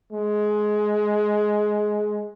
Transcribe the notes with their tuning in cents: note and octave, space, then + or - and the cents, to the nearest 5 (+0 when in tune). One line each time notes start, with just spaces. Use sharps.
G#3 +15